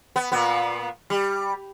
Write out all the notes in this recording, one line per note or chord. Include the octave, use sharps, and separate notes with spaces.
B3
A#2 B3
G3